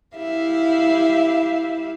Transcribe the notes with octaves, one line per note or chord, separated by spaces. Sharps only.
E4 G4 E5 F5